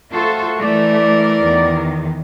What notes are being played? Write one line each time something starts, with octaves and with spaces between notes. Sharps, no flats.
A3 F4 F#4 A4 C5 C#6
E3 A3 A#4 D5
E2 D#3